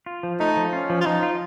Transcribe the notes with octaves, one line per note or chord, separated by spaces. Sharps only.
F4
F3
A3 D#4
F3
C#4 F4
F3
F4
F3 D#4
F4